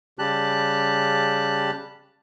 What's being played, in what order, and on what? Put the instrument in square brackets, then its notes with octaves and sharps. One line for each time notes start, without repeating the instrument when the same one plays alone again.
[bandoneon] C#3 G3 G4 A5 F#6